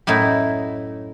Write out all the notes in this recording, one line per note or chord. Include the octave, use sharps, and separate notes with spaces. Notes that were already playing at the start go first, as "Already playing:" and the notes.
F#2 A2 D#4 E4